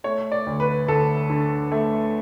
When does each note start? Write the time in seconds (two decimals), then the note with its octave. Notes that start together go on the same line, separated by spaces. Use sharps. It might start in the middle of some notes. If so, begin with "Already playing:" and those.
0.04 A3 C#5
0.32 D5
0.46 D2
0.60 B4
0.88 D2 A4
1.30 D3
1.72 A3